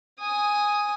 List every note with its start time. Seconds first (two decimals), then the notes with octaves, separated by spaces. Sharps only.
0.20 G#5 D#6